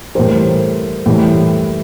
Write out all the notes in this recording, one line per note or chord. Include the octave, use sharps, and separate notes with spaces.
A2 E3 G3 A#4 C5
A2 E3 G3